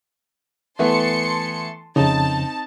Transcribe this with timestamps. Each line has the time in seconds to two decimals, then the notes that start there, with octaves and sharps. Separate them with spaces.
0.79 E3 A3 B3 A5 C6 C#7
1.96 F2 C#3 C4 D#4 A5